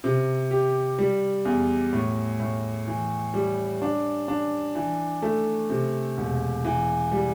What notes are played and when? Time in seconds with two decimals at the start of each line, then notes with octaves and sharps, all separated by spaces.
0.04 C3
0.51 G4
0.99 G3
1.45 E2
1.93 A2
2.40 A2
2.87 E3
3.34 G3
3.82 D4
4.28 D4
4.75 E3
5.22 A3
5.70 C3
6.17 E1
6.65 E3
7.12 G3